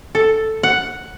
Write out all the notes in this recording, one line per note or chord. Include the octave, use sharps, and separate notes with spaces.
A4
F#5